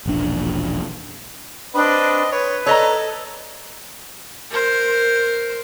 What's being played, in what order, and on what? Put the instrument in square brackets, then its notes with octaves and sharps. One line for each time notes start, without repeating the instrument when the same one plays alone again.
[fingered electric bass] E1 A#1 D4
[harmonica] C4 B4 D#5 [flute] D4
[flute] B4 [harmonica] C#5
[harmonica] A4 [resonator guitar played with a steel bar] C#5 D#5 A#5
[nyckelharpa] A#4 C5